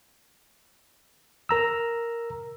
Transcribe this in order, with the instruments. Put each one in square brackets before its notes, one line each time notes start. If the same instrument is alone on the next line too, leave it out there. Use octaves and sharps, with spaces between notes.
[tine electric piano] A#4 A#5 E6